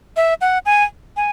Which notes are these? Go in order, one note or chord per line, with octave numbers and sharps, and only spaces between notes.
E5
F#5
G#5
G#5